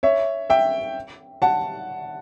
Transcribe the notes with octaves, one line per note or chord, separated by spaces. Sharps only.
C#5 E5
E5 G5
F#5 A5